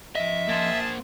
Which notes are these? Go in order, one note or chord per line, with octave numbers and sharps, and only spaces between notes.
F3 D#5 E5
A#3 G#4 C5 A5